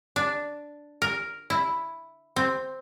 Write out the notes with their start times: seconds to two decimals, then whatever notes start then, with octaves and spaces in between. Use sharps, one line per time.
0.16 D4
1.02 A#4
1.50 E4
2.36 C4